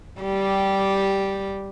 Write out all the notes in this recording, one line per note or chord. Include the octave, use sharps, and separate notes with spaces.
G3 G4